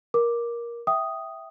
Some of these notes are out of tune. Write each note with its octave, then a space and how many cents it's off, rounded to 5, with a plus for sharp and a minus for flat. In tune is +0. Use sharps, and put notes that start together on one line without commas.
A#4 +15 D6 +0
E5 +0 G5 -20 D#6 +0